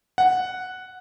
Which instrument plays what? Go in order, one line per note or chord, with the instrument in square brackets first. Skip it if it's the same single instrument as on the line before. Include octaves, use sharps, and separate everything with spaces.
[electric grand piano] F#5